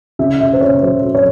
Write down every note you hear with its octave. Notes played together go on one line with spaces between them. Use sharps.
C#3 E5
C#3 E5
C5
C#3 C#5
F#3 C5
F#3
C#5